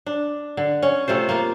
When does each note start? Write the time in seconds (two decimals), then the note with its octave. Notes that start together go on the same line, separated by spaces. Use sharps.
0.07 D4
0.57 D3
0.82 C#4
1.08 C3 A3 F4 C5
1.29 A#3 F4